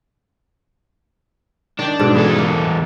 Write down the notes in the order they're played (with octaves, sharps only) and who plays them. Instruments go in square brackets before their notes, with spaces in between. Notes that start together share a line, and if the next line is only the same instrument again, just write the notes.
[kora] D#3 G5 [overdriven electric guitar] D4
[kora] G#2 B2 A4
[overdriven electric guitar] E2 A4 [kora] E4 G#4
[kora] A#3